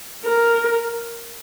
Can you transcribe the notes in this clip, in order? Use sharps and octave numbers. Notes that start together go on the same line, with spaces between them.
A#4